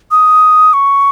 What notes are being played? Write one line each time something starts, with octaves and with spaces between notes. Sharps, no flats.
D#6
C#6